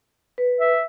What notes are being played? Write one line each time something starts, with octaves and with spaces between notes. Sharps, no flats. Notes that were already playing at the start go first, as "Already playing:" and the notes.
B4
E5